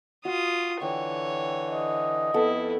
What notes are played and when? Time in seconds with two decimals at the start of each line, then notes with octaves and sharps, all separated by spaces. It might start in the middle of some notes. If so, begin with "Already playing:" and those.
0.25 F4 F#4 D#6
0.82 D3 E3 C#5 G5
1.70 D#5
2.34 F2 B3 E4 A4